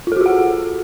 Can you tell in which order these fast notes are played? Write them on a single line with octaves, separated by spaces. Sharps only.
F4 A4 F#4 G#4 F#5